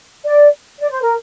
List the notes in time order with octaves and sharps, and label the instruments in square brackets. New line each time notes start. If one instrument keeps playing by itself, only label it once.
[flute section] D5
D5
C5
A#4